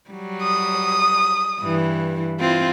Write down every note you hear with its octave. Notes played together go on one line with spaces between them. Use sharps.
F#3 G3
D#6
G2 E3
C4 E4 F4